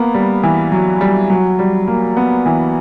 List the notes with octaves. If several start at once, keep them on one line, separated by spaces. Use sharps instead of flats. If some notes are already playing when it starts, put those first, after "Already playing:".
Already playing: A#3 B3
G3
E3
F#3
G3
F#3
G3
A#3
B3
E3